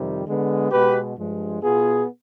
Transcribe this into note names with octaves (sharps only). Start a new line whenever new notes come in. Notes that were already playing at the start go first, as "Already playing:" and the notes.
Already playing: F2 C3 D#3 G3
D3 G#3 B3
B2 G#3 B3 G4 B4
G2 F3 G#3
B2 B3 F4 G#4